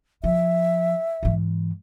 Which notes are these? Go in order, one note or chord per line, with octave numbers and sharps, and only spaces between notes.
F3 E5
G#2 E3